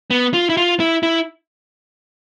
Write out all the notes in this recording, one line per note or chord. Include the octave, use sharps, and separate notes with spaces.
B3
F4
E4
F4
E4
E4